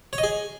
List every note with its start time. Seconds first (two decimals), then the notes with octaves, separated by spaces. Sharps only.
0.13 C#5
0.18 D#5
0.23 G#4